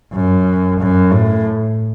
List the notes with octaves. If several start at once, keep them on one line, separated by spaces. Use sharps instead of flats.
F#2
F#2
A2